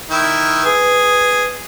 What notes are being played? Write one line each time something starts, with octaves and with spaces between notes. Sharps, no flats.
D#3 E4
G#4 B4